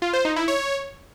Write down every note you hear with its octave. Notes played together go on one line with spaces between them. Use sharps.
F4
C5
D#4
E4
C#5